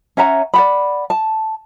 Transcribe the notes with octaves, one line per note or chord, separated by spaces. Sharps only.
C#4 E5 F#5 A#5
D5 F#5 B5
A5